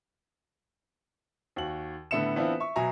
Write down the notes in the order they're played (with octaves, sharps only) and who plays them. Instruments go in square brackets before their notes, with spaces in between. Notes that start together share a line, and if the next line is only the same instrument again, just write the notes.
[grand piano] D#2 F#4 F#7
A2 D3 B3 E5 C#7 E7
E3 B3 C4 D4 E4 F4
E5 C#6
B2 F#3 E5 G#5 A#5